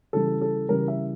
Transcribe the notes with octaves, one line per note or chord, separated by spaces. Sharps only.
C#3 E3 G3 A4
A4
C#3 E3 G3 A#4
E5